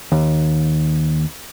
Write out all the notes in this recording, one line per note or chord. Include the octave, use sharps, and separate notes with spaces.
D#2